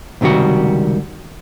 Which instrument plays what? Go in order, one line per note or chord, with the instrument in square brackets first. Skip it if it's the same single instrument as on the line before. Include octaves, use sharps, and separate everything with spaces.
[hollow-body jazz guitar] C#2 C3 D#3 G3 F#4